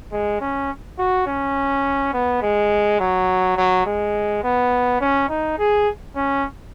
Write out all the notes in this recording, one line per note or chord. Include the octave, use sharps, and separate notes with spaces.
G#3
C#4
F#4
C#4
B3
G#3
F#3
F#3
G#3
B3
C#4
D#4
G#4
C#4